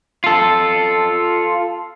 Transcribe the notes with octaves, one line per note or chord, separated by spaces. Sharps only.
F4 A4